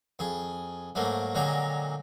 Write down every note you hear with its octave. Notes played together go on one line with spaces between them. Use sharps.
F2 G#4
G#2 F#3 A3 A#3
A#2 D3 F#3 G#3 G5 A#5